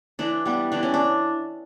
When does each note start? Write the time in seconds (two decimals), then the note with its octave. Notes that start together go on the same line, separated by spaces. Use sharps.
0.19 E3 D4
0.46 G3 B3
0.72 E3 D4
0.83 C#4
0.94 D4